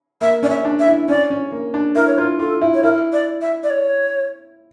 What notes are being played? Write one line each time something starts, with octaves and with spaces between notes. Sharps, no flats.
A#3 E5
C#4 D5
E5
D4
E5
E4
C#4 D5
C#4
A#3
D4
E4 A#4
C#5
F4 A#4
F4 A4
E4
C#5
E4 A#4
D5
E5
D5
C#5